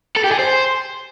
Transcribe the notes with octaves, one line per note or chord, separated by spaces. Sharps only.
A4
G4
G#4
C5